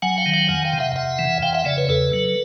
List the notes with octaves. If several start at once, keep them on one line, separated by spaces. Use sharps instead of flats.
F#3 F#5 G#5
F5 G5
D#3
F5 G5
F2 F#5 G#5
F5 G5
C3
E5 F#5
F2 E5 F#5
E3
F2 F5 G5
E5 F#5
C#3 D5 E5
B4 C#5
E2 A4 B4
F#3